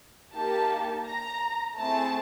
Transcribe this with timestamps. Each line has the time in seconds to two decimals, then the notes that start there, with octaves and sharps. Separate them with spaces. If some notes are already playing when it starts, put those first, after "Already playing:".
0.34 A#3 D#4 G4 A5
1.06 A#5
1.77 A3 C4 E4 G#4 A5